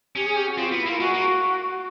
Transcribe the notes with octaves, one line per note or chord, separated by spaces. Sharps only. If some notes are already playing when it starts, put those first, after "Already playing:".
C#4 G4
G#4
G4
F#4
C4 F4
B3
E4
A#3 F4
G#3 F#4
A#3